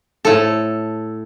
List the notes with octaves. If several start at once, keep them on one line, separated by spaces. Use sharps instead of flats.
A2 A4